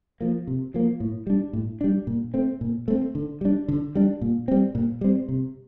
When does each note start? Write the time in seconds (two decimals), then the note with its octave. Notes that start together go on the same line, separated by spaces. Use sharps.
0.21 F3 A#3
0.47 C3
0.74 F3 A#3
1.00 A2
1.27 G3 D4
1.53 A2
1.81 G3 D4
2.07 A#2
2.34 A3 C4
2.61 A#2
2.88 A3 C4
3.15 D3
3.41 G3 D4
3.68 D3
3.95 G3 D4
4.21 A#2
4.48 G3 C4
4.75 A#2
5.01 G3 C4
5.29 C3